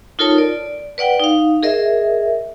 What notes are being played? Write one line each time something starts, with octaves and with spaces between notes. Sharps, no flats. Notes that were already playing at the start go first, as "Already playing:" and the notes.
D#4 F4 A4 A#4 C#5 A5
D5
B4 D5 F#5 G5
D#4 F5
G#4 A#4 D#5 E5